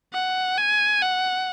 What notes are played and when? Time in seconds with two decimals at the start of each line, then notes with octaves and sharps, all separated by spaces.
0.14 F#5
0.58 G#5
1.02 F#5